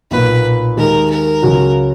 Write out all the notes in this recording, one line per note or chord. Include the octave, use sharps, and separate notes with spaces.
B1 A#2 A#3 B4
D#2 D#3 G#3 A#4
A#4
C#2 C#3 F#3 C#4 F#4